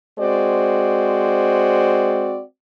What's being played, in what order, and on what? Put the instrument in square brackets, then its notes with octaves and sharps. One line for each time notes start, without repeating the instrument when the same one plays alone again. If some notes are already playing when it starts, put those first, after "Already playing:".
[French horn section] G#3 C4 F#4 C5 D5